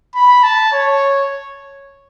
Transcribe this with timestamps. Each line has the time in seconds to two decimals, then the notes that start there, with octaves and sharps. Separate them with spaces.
0.15 B5
0.43 A5
0.73 C#5